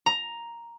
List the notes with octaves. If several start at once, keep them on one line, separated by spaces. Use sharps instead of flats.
A#5